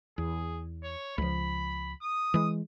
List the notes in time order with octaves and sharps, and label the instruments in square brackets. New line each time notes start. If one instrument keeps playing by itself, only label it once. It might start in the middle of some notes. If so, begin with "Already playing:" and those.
[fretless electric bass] E2 [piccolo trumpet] G#4
[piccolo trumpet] C#5
[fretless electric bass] C#2 F3 [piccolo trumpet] B5
[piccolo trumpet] D#6
[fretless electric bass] E3 G#3